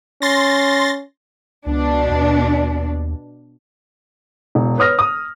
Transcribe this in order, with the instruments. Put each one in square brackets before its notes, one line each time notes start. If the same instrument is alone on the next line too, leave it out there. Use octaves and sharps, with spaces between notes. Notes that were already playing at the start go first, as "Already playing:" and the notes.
[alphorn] C#4 [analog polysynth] C6 A6 A#6
[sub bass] C#2 [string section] B2 D4
[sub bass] D#2
[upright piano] E1
B4 C#5 D#6 F6 A#6
D#6